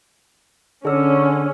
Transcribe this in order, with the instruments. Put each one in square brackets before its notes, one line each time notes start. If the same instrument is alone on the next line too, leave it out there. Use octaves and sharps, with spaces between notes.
[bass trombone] D3 [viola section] C#4 [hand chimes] G#4 E6 C#7